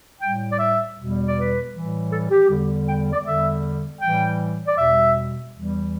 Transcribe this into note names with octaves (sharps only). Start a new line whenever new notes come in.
A2 G3 G5
D5
E5
E2 B2 G3
D5
B4
A2 E3 G3
A4
G4
E2 D3 G3
G5
D5
E2 D3 G3 E5
A2 E3 G3 G5
D5
E2 B2 G3 E5
E2 E3 G3